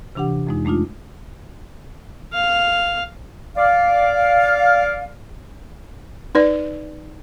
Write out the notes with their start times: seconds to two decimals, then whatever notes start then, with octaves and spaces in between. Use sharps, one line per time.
0.15 C3 E3 D4 G4 F#5
0.47 F2 G#3 D#4
0.65 G#3 A3 D4 D#4 F4
2.33 F5
3.57 D5 F5
6.35 D#4 B4 D5